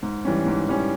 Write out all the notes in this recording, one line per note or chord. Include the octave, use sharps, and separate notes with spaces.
G#2
E3 G3 C#4
G#2
E3 G3 C#4